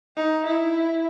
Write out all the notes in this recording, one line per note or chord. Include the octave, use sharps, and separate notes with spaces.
D#4
E4